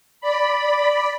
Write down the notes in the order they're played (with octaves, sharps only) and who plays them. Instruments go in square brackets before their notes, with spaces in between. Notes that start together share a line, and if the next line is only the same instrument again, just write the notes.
[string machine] D5 B5